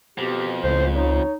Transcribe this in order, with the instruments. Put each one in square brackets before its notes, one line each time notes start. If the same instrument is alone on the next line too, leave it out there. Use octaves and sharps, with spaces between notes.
[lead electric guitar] F2 [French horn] B2 [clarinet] G4
[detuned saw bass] C#2 [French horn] A2 [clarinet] C5
[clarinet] D#4 [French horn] C#5